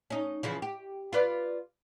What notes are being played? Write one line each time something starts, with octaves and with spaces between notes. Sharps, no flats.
C#4 D#4
C#3 E3 F3
G4
F4 B4 D5